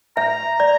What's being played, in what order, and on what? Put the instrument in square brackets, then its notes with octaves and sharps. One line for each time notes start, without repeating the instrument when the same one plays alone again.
[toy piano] E5 [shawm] A#5
[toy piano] D5